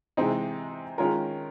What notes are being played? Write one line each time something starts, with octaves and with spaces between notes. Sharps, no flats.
C3 E3 G#3 C4 D#4
D#3 G#3 C#4 F4 A#4